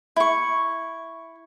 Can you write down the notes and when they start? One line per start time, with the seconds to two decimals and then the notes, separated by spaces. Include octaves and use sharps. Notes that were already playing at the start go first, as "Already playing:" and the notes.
0.16 E4 C#6